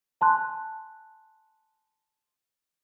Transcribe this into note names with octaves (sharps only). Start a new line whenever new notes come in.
G#5 A5 C6 F#6